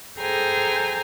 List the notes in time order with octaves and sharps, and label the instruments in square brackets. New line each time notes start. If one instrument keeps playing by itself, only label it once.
[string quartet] G#4 A4 C5 G5 G#5 A#5